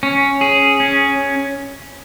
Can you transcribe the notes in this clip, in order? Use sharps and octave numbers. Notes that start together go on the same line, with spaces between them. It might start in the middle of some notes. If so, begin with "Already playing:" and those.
C#4
G#4
C#4